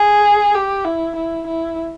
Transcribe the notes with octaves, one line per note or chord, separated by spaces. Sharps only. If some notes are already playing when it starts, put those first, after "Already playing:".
Already playing: G#4
G4
E4
E4
E4